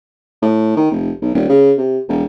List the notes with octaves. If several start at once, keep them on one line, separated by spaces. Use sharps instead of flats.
A2
D#3
F1
B1
D#1
C#3
C3
E1